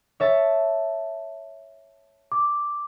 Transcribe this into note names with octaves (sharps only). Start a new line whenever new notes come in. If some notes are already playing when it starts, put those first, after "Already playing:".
C#5 E5 A5
D6